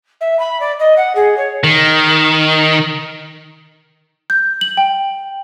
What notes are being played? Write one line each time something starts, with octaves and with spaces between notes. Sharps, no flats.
E5
B5
D5
D#5
F#5
G#4
C#5
D#3
G6
F#7
G5